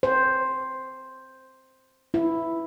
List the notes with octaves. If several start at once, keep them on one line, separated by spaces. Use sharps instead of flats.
C5
E4